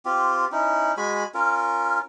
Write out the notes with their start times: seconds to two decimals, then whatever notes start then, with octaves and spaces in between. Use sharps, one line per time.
0.05 C4 F4 G4
0.52 C#4 D#4 E4
0.97 G#3 F#4 G#5 B5
1.34 C#4 F4 A#4